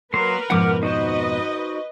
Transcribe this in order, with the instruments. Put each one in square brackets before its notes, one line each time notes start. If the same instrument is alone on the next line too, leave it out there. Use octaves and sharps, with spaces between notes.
[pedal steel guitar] F#3 A#3 C6 [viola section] A#4 B4
[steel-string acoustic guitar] F2 G#2 B2 [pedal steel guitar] F#5 D6 F6
[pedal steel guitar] D#4 F#4 C5 [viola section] B4 D#5